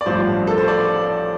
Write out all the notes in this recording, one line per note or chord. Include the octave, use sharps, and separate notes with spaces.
D5
A1 G2 F3 C5
A4
C5
D5